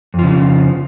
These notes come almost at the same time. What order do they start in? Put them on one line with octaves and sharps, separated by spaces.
F2 F3 C#3